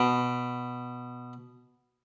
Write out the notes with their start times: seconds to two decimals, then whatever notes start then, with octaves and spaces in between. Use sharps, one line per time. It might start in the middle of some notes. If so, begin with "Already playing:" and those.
Already playing: B2